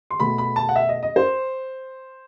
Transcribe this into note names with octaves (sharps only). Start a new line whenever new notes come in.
C6
B2 A3 B5
B5
A5
F#5
E5
D#5
D#5
C5